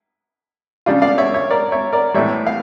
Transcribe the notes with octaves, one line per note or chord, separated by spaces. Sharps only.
C#3 G3 D4 F4
D5 F5
C#5 E5
C#5 E5
A#4 D5
C#5 E5
A#4 D5
A2 E3 G3 C#5 E5
F5